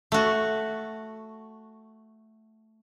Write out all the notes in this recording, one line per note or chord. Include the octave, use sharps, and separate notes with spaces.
A3 F#4